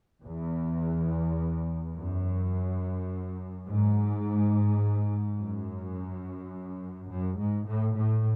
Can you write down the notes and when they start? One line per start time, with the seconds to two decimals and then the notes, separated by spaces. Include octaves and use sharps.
0.24 E2
1.96 F#2
3.67 G#2
5.38 F#2
7.09 F#2
7.38 G#2
7.67 A2
7.96 A2